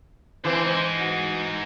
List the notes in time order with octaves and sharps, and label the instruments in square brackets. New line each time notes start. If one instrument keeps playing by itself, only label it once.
[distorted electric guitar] D3 C4 [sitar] E3 [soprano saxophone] C5
[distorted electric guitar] G#3 D#4 [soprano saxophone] C5
[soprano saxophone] F#4